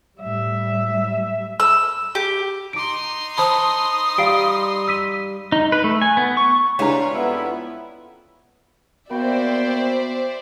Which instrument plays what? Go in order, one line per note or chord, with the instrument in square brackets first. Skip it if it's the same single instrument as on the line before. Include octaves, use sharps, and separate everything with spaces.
[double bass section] A2 G3 [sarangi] E5
[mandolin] E6
G4
[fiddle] D#4 C6 [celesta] D6 D7
[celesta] C5 A5 B5 [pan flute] D#6
[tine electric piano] G3 [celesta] F5 C7 D7
[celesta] E6 B6 D#7
[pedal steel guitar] D#4
B4
A3
G#5
B3
C#6
[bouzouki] G3 F4 B4 [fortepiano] G#3 D4 A#5 [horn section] C#5
[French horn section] F2 B3 [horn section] C#4 E4 E5
[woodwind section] A#3 F#4 G5 [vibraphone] B3 [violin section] C5 D5 E5